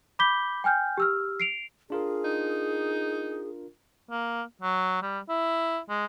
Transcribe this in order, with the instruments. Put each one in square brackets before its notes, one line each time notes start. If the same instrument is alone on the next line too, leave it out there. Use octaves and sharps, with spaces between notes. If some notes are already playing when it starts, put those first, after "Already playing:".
[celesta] B5 D6 G6 B6 G7
G5 G#5 F6 G6
G4 E6 F6
C7 D7 F7
[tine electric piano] D4 F4 A#4 [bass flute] G#4
[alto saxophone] D#4
[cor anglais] A#3
F#3
G3
E4
G#3